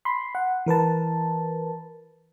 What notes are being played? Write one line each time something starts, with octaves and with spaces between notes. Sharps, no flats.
B5 C6
F#5
E3 A#4 B4 A5